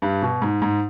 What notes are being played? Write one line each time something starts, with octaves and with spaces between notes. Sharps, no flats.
G2
B2
G#2
G#2